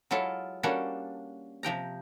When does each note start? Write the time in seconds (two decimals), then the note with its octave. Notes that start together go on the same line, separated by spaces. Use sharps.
0.11 F#3 G#3 E4 F4 A4
0.63 G3 A#3 C#4 D4 F#4 A4
1.63 C3 F3 G5 A#5